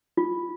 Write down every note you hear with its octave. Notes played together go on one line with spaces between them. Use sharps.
F4